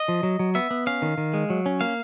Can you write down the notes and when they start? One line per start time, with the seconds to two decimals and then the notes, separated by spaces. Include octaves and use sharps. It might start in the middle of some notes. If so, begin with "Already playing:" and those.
Already playing: D#5
0.08 F3
0.23 F#3
0.39 F#3
0.55 B3 E5
0.71 B3
0.87 C#4 F5
1.02 D#3
1.18 D#3
1.34 G#3
1.50 F#3
1.66 C#4
1.81 A#3 F5